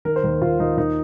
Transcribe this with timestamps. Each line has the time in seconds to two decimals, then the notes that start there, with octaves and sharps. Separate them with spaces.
0.05 D#3 A#4
0.16 C5
0.23 D#2 A#4
0.41 D#2 F4
0.60 D#2 D#4
0.77 D#2 D#4